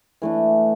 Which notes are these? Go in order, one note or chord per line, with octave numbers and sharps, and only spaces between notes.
E3 A3 D4